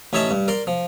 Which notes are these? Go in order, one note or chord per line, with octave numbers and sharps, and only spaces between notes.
A1 C#4 D#4 C#5 E5 A5
G2
A#4 D5 C6
F3